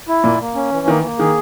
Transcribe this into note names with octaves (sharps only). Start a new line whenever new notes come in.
E4
A#2 A#3
A#3
C#4
E3
D#3 A#3
A#3
D#3 G#4